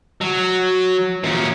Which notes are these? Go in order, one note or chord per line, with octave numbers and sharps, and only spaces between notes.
F#3
A#2 C#4